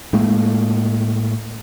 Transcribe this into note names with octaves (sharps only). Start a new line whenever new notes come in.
A2 G#3 A#3